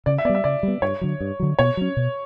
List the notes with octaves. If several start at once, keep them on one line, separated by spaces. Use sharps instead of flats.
C#3 D5
E5
G3 B3 D5
E5
C#3 D5
G3 B3
G2 C#5
D3 F#3
G2
D3 F#3
B2 C#5
F#3 C#4
B2